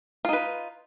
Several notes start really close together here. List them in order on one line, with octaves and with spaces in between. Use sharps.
F4 D#4 B4